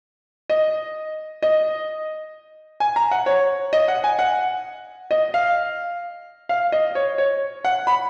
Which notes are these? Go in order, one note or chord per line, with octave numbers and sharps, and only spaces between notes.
D#5
D#5
G#5
A#5
F#5
C#5
D#5
F#5
G#5
F#5
D#5
F5
F5
D#5
C#5
C#5
F#5
B5